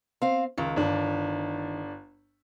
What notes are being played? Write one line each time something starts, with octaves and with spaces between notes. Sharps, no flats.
C4 F5
C#2 D#3
G1 D4